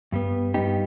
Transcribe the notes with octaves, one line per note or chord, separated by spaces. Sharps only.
G2 G3 B3
G2 G3 B3 D#4 G4